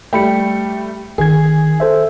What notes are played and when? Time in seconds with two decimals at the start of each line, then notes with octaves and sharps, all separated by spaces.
0.13 G3 A3 G5 B5 C#7
1.18 G1 D#3 G#4 G#6
1.80 A4 C5 E5